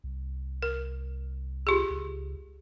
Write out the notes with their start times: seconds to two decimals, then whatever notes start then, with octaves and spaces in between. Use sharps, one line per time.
0.04 C2
0.63 A#4
1.67 F4 G4 G#4
1.90 C#2